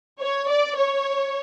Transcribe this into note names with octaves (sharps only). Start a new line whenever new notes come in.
C#5
D5
C#5